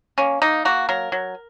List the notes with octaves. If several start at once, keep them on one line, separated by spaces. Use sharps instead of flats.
A#3 C#4
A#3 D#4
A#3 F#4
F#3 A#4
F#3